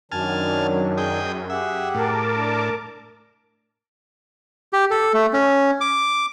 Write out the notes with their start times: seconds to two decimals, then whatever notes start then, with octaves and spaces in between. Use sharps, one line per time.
0.12 F#2 D#3 F#3 D4 G#5 A5 F6
0.98 G#4 D#5 G5
1.50 G4 G#4 E5 F#5
1.95 A2 A#4 A5 D6
2.35 D4
4.73 G4
4.91 A4
5.14 A3
5.33 C#4
5.81 D6